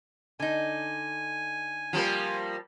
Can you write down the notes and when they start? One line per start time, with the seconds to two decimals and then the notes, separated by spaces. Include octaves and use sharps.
0.40 D3 D#4 G#5
1.93 F3 G3 A#3